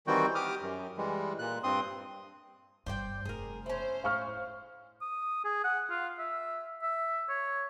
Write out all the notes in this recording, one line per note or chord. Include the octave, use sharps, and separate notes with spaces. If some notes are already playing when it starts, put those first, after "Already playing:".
D#3 E3 G3 C4 F#4 G5
G4 D6 D#6 F6
F#2
E3 G3 G#3
A#2 F#6
G2 C4 C6 D#6
G1 G2 C5 D5 G5
F1 G#4 A#4
C#4 E4 C5
A2 F5 C#6 F6
D#6
G#4
F#5
F4
E5
E5
C#5